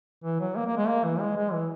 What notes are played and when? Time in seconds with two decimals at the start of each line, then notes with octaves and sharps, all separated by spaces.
0.24 E3
0.41 F#3
0.56 A#3
0.67 A#3
0.77 G#3
0.88 A#3
1.04 E3
1.20 G#3
1.37 G#3
1.53 E3